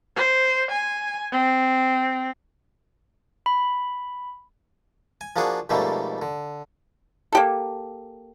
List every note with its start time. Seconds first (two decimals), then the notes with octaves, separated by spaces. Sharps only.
0.16 C5
0.71 G#5
1.32 C4
3.46 B5
5.21 G#5
5.36 F3 A#3 D4 F#4 G#4
5.69 F2 G#2 B2 G3 A3 A#3
6.22 D3
7.33 A#3 G4 A4